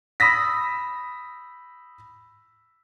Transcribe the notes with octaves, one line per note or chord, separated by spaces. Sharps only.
B5 D#6 E6 A#6 B6